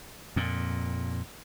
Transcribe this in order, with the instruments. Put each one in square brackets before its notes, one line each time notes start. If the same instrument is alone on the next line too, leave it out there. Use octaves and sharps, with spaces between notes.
[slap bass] F2 A#2